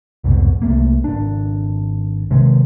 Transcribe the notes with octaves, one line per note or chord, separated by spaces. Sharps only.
C2 F2 G#2 B2
C2 A3 A#3
G#1 D4
C3 D#3 G#3